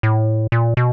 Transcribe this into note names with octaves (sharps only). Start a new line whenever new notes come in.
A2
A#2
B2